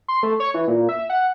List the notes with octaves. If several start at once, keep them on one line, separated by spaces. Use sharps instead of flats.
C6
A3
C#5
E3
A#2
E5
F#5